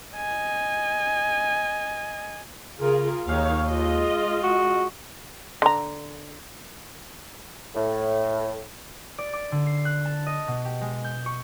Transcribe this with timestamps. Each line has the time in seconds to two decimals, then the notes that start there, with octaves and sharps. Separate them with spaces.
0.16 D#5 G#5
2.81 C#3 F4 G#4 A#4
3.27 D#2 D#3 C#5 F5
3.67 G#3 F4 D#5
4.43 F#4
5.62 D3 A#5
7.75 A2
9.18 D5
9.33 D6
9.52 D3
9.66 C7
9.85 F#6
10.05 A5
10.26 D#5
10.48 B2
10.65 G4
10.81 G#3
11.04 G6
11.26 C#6